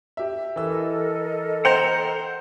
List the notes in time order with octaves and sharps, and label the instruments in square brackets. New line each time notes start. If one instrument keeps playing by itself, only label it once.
[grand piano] G4 E5
[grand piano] E3 E6 [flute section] A4 A#4 D#5
[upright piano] C5 [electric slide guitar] F#5 G5 A#5